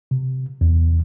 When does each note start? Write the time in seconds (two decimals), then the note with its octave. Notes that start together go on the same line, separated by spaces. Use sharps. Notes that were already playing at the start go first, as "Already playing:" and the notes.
0.11 C3
0.61 E2